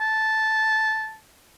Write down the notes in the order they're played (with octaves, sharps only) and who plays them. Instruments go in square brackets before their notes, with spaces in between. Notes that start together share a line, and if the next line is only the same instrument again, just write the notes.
[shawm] A5